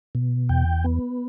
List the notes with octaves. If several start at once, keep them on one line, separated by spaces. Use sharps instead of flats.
B2
E2 G5
B3